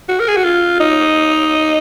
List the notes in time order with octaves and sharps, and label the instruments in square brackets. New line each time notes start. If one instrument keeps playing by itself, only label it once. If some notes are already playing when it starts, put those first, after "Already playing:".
[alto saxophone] F#4
A#4
G#4
F#4
F4
D#4